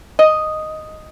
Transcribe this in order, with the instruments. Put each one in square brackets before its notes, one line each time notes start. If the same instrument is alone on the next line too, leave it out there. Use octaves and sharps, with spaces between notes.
[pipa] D#5